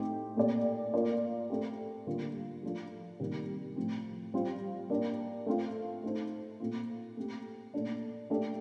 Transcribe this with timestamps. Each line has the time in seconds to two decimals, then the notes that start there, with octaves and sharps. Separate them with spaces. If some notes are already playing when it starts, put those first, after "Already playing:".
Already playing: A2 A3 C4 D#4 G4
0.37 A#2 A3 C4 G4 D5
0.93 A#3 F4 A#4 D5
1.50 A3 C4 G4
2.07 D3 G3 A#3 F4
2.63 F3 A3 D4 F4
3.20 C3 D#3 G3 A#3
3.76 A2 F3 C4
4.34 G3 C4 F4 C5
4.90 A#3 D4 G4
5.46 A3 C4 F4
6.04 A3 D#4 A4 C5
6.60 A#2 A3 C4 F4
7.17 A3 C4 G4
7.74 A#2 A3 D4
8.30 A3 D4 G4